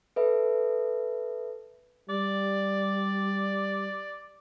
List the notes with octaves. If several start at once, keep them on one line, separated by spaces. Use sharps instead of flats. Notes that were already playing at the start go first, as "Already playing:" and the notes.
A4 B4 E5
G3 D5